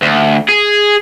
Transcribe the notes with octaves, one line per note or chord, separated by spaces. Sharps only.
D2
G#4